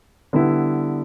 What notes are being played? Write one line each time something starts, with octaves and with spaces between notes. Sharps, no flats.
D3 G3 B3 E4